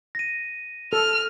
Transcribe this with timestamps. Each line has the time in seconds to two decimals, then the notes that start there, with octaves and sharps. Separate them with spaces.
0.15 A#6 D#7
0.93 A4 F6